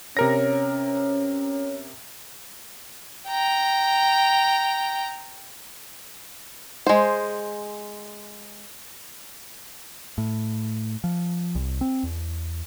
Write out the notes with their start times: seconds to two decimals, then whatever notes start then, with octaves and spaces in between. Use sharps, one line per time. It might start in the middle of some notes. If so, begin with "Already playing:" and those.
0.17 C3 C#4 A#4 C#5 A#6
3.28 G5 A#5
6.87 G#3 C5
10.18 A2
11.04 F3
11.55 C2
11.81 C4
12.03 E2